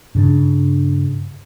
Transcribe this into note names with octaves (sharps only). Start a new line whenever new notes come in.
G2 C#3 D4